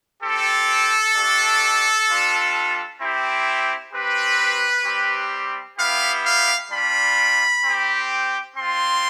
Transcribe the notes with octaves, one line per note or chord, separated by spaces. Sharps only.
C4 G4 A4
A3 D4 G4
G3 D4 F4
C4 E4 G4
C4 G4 B4
G3 C4 G4
B3 E4 G4 F5
F5
G3 D4 F4 B5
C4 G4
C4 F4 C6